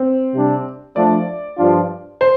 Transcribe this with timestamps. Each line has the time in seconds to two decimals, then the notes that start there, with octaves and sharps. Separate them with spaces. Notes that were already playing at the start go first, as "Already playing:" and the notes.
Already playing: C4
0.34 C3 G3 D4
0.96 F3 A3 D4 D5
1.58 G2 F3 D4 F4
2.21 C5